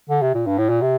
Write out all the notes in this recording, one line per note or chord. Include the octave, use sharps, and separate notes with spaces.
D3
C3
A#2
G2
A2
A#2
C3